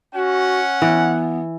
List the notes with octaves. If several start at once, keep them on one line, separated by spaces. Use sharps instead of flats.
C#4 F#4 F#5
E3 B3